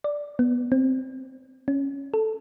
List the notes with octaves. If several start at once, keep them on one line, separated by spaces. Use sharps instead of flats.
D5
B3
C4
C#4
A4